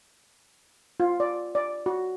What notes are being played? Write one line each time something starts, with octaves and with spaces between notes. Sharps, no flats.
F4
D5
D5
F#4